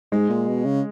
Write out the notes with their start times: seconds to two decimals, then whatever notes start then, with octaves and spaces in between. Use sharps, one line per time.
0.12 G#2 G#3
0.29 A#2
0.48 B2
0.65 C#3